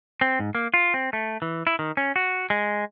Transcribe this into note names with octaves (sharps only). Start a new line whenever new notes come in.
C4
G#2
A#3
F4
C4
A3
E3
E4
D#3
C#4
F#4
G#3